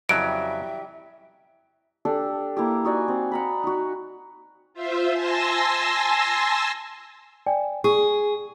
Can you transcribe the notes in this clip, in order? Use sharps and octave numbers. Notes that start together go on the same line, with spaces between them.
F2 C#3 E3 F#3 G3 E5 D7
D4 G4 A4 D5
A#3 E4 G4
D#4 F#4 D5 G#5
C4
F#5 A#5 B5
D#4 F#4
F4 C5 E5
G#5 A5 C6 E6 A#6
D5 G5 G#5
G#4 C#6